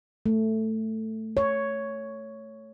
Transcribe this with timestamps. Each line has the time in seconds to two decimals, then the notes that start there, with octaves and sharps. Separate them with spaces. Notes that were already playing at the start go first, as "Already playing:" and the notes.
0.26 A3
1.37 C#5